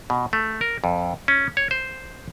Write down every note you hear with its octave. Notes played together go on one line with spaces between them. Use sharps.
B2
A3
A#4
F2
C#4
C#5
C5